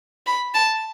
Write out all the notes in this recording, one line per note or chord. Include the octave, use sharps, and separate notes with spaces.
B5
A5